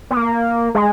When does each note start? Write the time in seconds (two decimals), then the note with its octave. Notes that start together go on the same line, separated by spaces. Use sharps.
0.11 B3
0.17 A#3
0.75 G#3